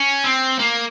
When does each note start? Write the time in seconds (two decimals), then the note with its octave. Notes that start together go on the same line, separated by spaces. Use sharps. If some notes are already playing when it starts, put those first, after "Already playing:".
Already playing: C#4
0.24 C4
0.59 A#3